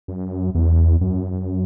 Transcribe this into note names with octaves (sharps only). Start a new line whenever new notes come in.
F#2
E2
F#2